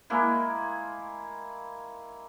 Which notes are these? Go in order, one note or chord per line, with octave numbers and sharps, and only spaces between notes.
G#3 A#3 E4